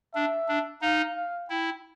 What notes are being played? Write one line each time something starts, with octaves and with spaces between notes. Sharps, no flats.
D4 E5
D4
D#4 F5
F5
E4 G5